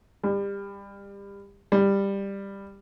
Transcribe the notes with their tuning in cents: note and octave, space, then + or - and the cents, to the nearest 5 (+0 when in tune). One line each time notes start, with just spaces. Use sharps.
G3 +25
G3 +10